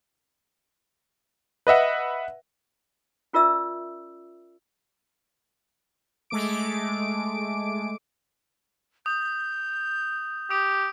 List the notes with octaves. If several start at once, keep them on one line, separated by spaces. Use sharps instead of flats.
B4 D#5 E5 F#5
C#4 F4 A#4 D5 E5 E6
G#3 A3 D6 D7
D#6 G6
G4 D#6 D7